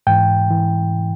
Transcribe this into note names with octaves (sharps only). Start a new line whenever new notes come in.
G#2 E3 G5
E3